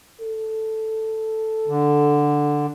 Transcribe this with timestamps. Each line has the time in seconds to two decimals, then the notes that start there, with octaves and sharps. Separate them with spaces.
0.21 A4
1.68 D3